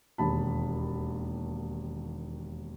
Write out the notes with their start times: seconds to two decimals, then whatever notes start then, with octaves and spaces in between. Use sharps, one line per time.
0.18 E1 D#2 A5 B5